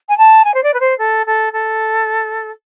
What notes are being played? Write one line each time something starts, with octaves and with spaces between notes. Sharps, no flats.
G#5
A5
G#5
C5
D5
B4
C5
A4
A4
A4